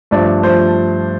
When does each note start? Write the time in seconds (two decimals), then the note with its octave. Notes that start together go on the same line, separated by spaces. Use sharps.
0.11 G2 F3 A3 D5
0.43 F3 A3 C5